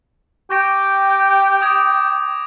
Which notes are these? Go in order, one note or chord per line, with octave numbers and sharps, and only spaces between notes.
G4 G5 C#6 A#6 D7
D6 D#6 G#6